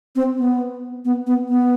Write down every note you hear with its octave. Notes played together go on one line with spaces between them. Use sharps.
C4
B3
B3
B3
B3